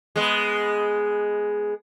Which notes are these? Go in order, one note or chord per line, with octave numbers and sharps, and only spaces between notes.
G#3 B3